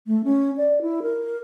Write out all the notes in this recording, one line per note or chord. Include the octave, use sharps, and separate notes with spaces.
A3
C#4
D5
E4
A#4